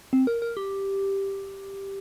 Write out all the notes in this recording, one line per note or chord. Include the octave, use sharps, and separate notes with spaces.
C4
A#4
A#4
G4